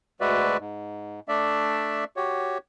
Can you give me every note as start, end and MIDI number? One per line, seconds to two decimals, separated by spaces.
0.21 0.57 38
0.21 0.57 56
0.21 0.57 66
0.21 0.57 71
0.21 0.57 74
0.21 0.57 76
0.60 1.20 44
1.28 2.04 57
1.28 2.04 62
1.28 2.04 74
1.28 2.04 76
2.16 2.58 66
2.16 2.58 67
2.16 2.58 73